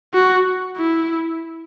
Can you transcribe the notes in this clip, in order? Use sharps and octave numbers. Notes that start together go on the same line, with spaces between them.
F#4
E4